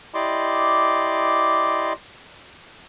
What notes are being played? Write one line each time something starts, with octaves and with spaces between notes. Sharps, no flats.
E4 G4 D5 D#5 C6 D6